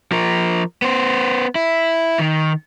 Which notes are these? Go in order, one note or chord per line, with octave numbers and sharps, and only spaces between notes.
F3 A#4
B3 C5
E4
D#3